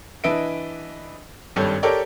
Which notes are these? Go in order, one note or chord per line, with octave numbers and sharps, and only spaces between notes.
E3 D4 B4 D#5 E5 D7
G#1 G2 G3 A4 C#5
G4 A4 A#4 C#5 D5 G5